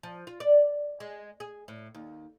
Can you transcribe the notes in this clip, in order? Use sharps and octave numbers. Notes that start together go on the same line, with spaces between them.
F3
F4
D5
G#3
G#4
A2
D#2